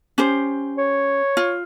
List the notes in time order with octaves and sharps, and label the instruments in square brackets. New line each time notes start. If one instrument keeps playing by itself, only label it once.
[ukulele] C#4 G4 C5
[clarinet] C#5
[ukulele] F4